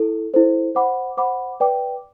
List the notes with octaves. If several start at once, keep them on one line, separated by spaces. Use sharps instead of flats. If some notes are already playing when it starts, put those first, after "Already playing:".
Already playing: E4 A4
E4 A4 C5
C5 F#5 B5 D6
C5 F#5 B5 D6
B4 D5 G5 D6